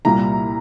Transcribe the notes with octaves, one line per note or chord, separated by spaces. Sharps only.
C2 A#2 G3 A#5